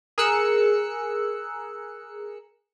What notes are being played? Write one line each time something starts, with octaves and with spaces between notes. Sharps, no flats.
G#4 A#4 E6 F#6 C#7